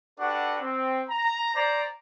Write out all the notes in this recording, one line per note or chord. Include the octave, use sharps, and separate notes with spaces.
D4 F#4 G4 A4 B4 F#5
C4
A#5
C5 D5 A#5